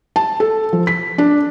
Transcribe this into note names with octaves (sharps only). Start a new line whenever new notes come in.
A5
A4
F3
B6
D4